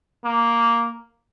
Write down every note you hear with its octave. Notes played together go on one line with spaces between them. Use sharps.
A#3